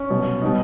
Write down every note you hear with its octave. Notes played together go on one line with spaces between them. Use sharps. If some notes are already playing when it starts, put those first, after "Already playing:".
Already playing: C#4
C2 B2 F#3
B2 G3 D#4